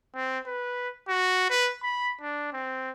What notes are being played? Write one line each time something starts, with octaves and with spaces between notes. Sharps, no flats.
C4
B4
F#4
B4
B5
D4
C4